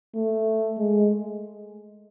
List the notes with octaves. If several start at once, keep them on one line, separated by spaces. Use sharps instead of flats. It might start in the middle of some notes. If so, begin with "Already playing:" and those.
A3
G#3